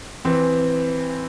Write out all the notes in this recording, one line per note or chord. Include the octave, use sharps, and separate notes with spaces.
E3 C4